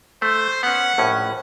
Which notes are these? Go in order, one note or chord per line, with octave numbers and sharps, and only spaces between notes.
A3 C5
B3 C#4 F#5
A#1 A2 C#4